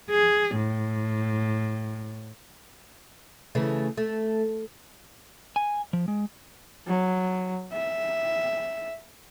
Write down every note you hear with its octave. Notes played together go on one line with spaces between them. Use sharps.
G#4
A2
C#3 E3 A3
A3
G#5
F3
G#3
F#3
E5